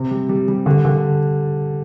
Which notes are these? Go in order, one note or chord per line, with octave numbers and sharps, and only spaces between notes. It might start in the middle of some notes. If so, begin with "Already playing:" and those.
Already playing: C3 C4
G3
G3
G3
D3
D3